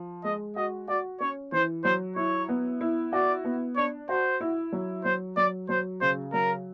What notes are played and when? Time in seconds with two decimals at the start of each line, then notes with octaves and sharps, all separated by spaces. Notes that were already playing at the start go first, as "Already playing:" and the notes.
Already playing: F3
0.24 G#3 D#5
0.56 F#4 D#5
0.88 F#4 D5
1.20 C#4 C#5
1.52 E3 C5
1.84 F#3 C5
2.16 E4 C#5
2.49 B3
2.81 E4
3.13 F#4 D5
3.45 B3
3.76 D4 C#5
4.09 F#4 C5
4.41 E4
4.72 F#3
5.04 F#3 C5
5.37 F#3 D5
5.69 F#3 C5
6.01 C#3 C5
6.32 F#3 A#4